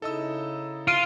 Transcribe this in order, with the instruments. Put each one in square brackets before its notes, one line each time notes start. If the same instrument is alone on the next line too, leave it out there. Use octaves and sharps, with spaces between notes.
[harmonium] C#3 D#4 E4 [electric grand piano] A4 D#5 E6
[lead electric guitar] F4 [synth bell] F6 D7 D#7